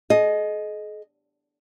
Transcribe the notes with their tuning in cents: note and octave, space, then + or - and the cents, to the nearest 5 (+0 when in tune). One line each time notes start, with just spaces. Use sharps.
G#4 +45 D#5 +0